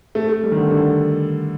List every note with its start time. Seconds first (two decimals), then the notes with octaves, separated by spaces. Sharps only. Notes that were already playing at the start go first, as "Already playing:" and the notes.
0.15 A3
0.29 A3
0.43 G3
0.51 D#3
0.57 D3
0.71 D3